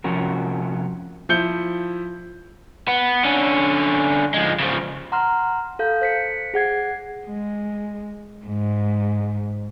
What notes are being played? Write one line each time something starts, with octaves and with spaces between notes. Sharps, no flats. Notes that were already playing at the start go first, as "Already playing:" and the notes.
C3 F3 C#4 F#4 A#4
F3 E4 G6 C#7 G7
B3
D3 C#4
F3 G#3
C#3 F3
F#5 A#5 C6 F6
A4 F5 G6
C5 B6 C#7
G#4 F#5 G#6 C7
G#3
G#2